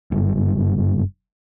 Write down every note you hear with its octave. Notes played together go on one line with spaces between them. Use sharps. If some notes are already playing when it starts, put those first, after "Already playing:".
F#1 G2